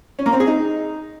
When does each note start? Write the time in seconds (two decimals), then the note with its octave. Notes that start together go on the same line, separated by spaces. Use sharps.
0.19 C#4
0.26 A#3
0.33 C4
0.40 G#4
0.47 D#4